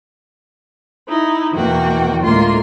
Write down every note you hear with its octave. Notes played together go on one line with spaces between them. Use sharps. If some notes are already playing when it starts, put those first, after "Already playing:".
D#4 E4
E2 B2 A#3 F#4 G5
D2 A2 G#3 A#3 F4 C6